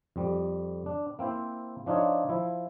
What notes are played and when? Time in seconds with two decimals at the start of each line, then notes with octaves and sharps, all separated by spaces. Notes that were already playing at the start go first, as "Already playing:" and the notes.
0.16 F2 G3
0.86 D4
1.19 A#3 C4 E4 C5
1.86 F3 D4 D#4 F4 C#5
2.29 F3 E4